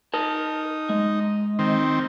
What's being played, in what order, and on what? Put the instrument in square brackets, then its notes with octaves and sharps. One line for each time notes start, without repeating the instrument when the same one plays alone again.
[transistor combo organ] D#4 [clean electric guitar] A#4 A5
[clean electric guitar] G#3
[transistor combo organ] D#3 C4